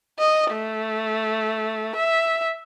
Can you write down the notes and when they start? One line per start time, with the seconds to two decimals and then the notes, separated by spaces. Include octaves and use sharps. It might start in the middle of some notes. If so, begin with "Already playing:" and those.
0.19 D#5
0.52 A3
1.96 E5